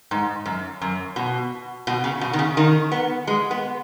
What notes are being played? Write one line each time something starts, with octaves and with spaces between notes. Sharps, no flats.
G#2
F#2
F#2
B2
B2
C#3
B2
D#3
C#3
D#3
B3
G#3
B3